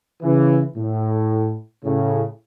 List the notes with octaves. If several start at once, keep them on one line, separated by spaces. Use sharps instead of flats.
C#3 E3
A2
A2 C#3